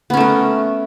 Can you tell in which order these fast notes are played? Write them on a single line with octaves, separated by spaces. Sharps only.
B3 C#4 A3 A#4